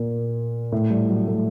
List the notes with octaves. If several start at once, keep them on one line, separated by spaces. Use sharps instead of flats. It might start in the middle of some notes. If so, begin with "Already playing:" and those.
Already playing: A#2 A#3
A2 A3
G3
F#3
A2 A3